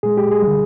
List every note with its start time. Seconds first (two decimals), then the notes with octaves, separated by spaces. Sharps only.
0.03 A#2 G#3 G#4
0.17 G4
0.31 G#4
0.42 G3
0.47 D3